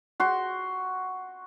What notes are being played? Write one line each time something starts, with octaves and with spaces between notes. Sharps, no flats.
F#4 C6